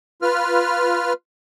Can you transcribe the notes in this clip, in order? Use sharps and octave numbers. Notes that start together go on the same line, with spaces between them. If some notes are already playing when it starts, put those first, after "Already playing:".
F4 B4 F6